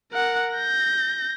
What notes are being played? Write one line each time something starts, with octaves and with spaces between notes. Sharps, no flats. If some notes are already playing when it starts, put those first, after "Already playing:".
A#4 F#5
G6 A#6